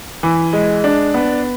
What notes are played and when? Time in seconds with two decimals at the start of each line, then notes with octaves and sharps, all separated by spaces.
0.23 E3
0.53 G#3
0.84 D4
1.14 B3